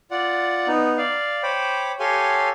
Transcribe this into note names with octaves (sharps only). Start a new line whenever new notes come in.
F4 D5 F#5
B3 D#4
D5 F5
C5 C#5 G5 B5 D6
G4 A4 C#5 F5 G#5 C6